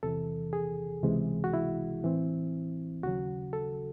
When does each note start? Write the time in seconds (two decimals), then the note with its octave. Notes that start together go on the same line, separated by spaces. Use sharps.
0.03 E2 C3 E3 A4
0.53 G#4
1.03 C#2 C3 E3 G#3
1.44 F#4
1.54 E4
2.04 A2 E3 C4
3.03 D#2 C#3 F#3 F#4
3.53 A4